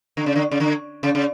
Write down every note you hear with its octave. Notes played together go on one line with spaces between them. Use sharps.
D3
C#3
D3
C#3
D3
C#3
C#3